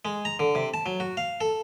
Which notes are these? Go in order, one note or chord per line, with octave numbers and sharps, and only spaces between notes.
G#3
A#5
D3
C3
A5
F#3
F#4
F5
A4